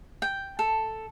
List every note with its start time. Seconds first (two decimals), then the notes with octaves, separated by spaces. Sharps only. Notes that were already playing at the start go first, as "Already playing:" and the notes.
0.22 G5
0.59 A4